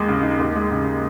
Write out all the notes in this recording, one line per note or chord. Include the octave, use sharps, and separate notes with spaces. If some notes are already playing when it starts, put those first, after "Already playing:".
Already playing: D#2 G#3
C#3
D#4
D#2
G#3
C#3